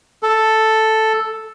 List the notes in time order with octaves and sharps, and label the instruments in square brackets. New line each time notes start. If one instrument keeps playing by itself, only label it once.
[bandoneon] A4